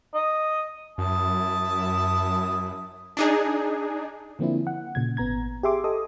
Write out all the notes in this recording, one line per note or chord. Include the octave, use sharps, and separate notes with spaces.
D#5
F#2 E4 A5 D#6
D4 D#4 G#4
D3 F3 A#3 C4 D4 E4
F#5
A#2 C#3 G#6
G#1 B3 A#5 G#6
G4 G#4 E5 C6 D6
G4 A4 D#5 D#6